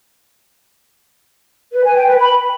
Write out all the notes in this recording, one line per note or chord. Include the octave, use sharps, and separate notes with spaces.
B4
G#5
G5
B4
B5